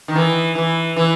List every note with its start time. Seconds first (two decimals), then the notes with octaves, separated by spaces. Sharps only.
0.08 D#3
0.15 E3
0.55 E3
0.96 E3